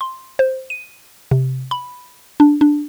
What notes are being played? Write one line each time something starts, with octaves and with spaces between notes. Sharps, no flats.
C6
C5
D#7
C3
B5
D4
D4